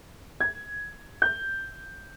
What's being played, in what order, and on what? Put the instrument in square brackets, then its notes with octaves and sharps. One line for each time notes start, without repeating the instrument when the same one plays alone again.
[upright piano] G#6
G6